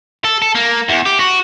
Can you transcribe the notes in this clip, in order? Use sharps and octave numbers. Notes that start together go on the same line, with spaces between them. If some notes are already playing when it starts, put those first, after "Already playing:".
A4
A4
A#3
E2
G4
F#4